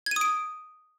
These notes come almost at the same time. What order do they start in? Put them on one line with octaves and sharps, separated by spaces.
G#6 D#7 D#6 D7